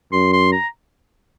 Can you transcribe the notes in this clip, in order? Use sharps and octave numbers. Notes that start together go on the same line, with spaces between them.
F#2 C6
C6
A#5